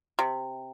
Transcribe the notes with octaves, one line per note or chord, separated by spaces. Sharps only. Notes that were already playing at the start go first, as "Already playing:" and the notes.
C3